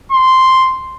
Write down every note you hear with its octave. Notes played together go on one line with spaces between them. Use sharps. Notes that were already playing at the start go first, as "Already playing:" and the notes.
C6